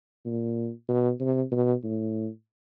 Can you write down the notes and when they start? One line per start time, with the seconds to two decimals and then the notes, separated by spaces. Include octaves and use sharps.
0.25 A#2
0.89 B2
1.20 C3
1.52 B2
1.84 A2